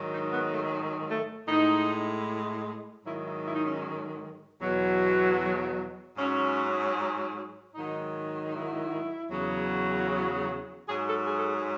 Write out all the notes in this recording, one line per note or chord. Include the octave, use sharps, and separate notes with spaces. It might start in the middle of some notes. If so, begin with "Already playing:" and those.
Already playing: G#2 D#3 F#3
D#4
B3
A3
A3
A2 G#3 D#4
G#2 D#3 F#3 E4
E4
E4
D#4
C#4
E2 B2 F#3
G#2 F#3 C#4
G#2 D#3 F#3 D#4
D#4
E4
E2 C#3 F#3
G#2 F#3 G#4
A4
G#4
A4
G#4